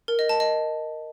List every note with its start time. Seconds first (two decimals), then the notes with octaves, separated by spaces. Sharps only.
0.08 A#4
0.19 D#5
0.29 A5
0.40 D#5